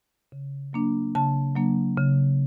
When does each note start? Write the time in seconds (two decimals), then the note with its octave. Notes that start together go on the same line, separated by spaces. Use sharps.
0.32 C#3
0.73 F#3 A#3 D4
1.15 C#3 A5
1.56 F#3 A#3 D4
1.97 C#3